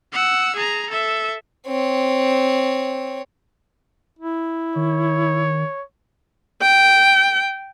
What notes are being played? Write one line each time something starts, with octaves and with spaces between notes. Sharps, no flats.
F#5 E6
G#4 A#5
A4 E5
C4 C#5
E4
D#3 C#5
G5